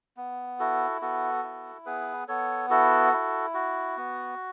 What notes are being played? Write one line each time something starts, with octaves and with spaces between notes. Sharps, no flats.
B3
E4 F#4 A4
B3 F#4 A4
E4
B3 G#4 B4
B3 A4 C#5
E4 F#4 A4
E4
F#4
B3